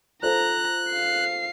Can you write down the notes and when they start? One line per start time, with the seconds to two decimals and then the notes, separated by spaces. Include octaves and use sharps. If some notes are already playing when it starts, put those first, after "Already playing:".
0.23 F4 A4 C5 A#5 F#6
0.92 F5 C7